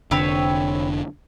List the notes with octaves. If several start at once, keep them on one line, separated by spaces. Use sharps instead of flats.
F1 D3 C4 B4 C#5